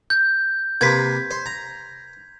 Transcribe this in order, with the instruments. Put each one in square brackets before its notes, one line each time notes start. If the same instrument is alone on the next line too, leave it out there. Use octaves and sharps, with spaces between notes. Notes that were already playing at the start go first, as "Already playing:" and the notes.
[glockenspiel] G6
[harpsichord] C3 A#3 B4 [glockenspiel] G#6 B6
[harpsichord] C5
A#5